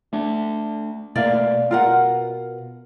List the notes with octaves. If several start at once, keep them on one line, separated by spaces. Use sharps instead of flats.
A3 D4
B2 A3 A#3 D5 F5
B2 F4 A#4 F#5